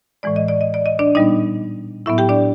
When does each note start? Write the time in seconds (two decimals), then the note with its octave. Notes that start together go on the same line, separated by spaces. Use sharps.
0.23 A2 E3 G#3 D5
0.36 D#5
0.48 D5
0.61 D#5
0.74 D5
0.86 D#5
0.99 D4 D5
1.15 A#2 G3 B3 D#4 D#5
2.06 A2 F#3 B3 E4 E5
2.18 G4 G5
2.29 D4 D5